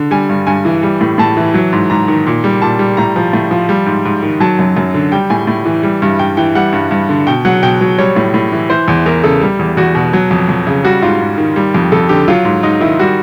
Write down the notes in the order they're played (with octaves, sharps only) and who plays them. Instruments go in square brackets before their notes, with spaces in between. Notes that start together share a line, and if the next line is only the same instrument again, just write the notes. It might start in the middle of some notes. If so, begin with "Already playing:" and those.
Already playing: [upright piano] D3
G3 G#5
G2
G2 G#5
E3
G3
A2
A2 A5
E3
F#3
G#2
G#2 A#5
D#3
A#2
G3
A#2 A5
G3
A2 A#5
F3
A2
F3
G3
G#2
G#2
D#3
F#3 A5
F#2
F#2
D3
G3 G5
A2 G#5
A2
E3
G3
G2
G2 G5
E3 G5
G3 F#5
G2
G2
D3
B2 G5
F#3 F#5
B2 G5
F#3
G3 C#5
A2
A2
E3
E3 C5
E2
E2 A#4
C#3 A4
G3
E2
E2 F#4
B2
F#3
F2
F2
C#3
G3 F#4
G#2 F4
G#2
D#3
G3
F2
F2 A4
D3 G4
F#3 F4
G#2
G#2 D#4
D#3 E4
G3 F#4